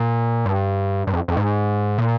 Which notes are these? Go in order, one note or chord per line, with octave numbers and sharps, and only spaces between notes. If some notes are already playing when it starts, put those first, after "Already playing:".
Already playing: A#2
G2
G2
F2
F2
G#2
A#2